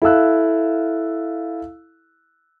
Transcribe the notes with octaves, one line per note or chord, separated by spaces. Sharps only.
E4 A4 F5 E6 F#6